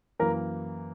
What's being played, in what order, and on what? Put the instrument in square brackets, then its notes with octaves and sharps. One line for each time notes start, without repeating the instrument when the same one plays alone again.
[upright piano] F#2 E3 A#3 [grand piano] A#4